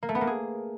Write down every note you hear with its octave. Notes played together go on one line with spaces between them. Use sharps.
A#3
A3
B3
A#3
G#4